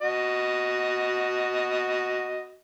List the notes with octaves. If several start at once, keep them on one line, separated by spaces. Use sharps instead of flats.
F#4 D#5